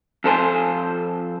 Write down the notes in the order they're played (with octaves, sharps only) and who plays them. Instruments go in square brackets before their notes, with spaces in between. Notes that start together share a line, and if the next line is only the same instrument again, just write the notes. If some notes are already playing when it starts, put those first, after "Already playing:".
[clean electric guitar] F2 A4 C5 G#5